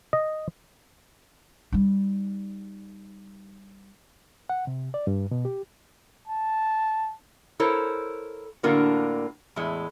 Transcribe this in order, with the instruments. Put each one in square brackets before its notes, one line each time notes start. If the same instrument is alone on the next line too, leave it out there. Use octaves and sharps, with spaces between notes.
[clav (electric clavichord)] D#5
[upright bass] G3 D#4
[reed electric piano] F#5
C3
D5
G2
B2
G4
[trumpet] A5
[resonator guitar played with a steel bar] E4 A4 A#4 C5 C#5
A2 D3 A#3 D4 F4 F#4
E2 A2 G#3